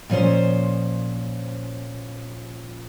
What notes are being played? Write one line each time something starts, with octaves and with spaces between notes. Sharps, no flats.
A#2 F3 C#4 C5